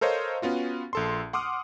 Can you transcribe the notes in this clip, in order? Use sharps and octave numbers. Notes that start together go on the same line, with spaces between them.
A4 A#4 C5 C#5 D#5 F5
B3 C#4 F4 F#4
A#1 A4 C6
F#5 C6 D6 D#6 F6